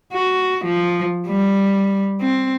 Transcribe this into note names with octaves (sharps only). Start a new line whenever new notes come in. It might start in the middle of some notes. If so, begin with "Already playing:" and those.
F#4
F3
G3
C4